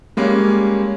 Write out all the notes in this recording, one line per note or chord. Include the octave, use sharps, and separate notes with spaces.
G3 G#3 A#3 C#4